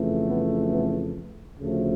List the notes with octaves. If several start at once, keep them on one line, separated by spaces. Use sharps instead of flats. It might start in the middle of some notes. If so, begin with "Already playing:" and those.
Already playing: F2 C#3 E3 A3
B3
B3
D2 C#3 F3 A3